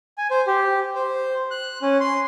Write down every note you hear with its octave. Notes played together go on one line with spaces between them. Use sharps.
G#5
C5
G4
C5
F#6
C#4
C6